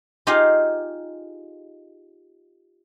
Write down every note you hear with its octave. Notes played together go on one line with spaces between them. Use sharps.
D#4 F4 G4 G#4 D#5 F5